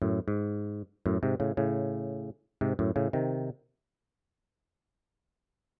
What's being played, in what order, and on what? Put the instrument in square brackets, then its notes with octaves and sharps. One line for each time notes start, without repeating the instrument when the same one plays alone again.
[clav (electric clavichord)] F#2 A2
G#2
F#2 A2
G#2 C3
A2 C#3
A2 C#3
G#2 C3
F#2 A2
A2 C#3
C3 D#3